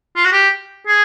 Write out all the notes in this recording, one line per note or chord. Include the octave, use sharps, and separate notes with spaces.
F4
F#4
G4
G#4